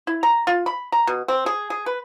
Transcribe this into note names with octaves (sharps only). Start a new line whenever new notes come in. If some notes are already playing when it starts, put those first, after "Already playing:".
E4
A#5
F4
B5
A#5
B2
C4
G#4
G#4
B4